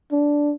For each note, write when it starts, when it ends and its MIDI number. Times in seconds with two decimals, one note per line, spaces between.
0.12 0.53 62